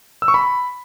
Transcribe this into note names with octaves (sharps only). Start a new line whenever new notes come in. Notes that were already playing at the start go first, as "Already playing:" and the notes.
E6
C#6
B5